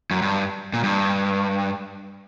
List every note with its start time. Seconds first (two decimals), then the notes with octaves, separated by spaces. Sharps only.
0.11 F#2
0.22 G2
0.73 A#2
0.84 G2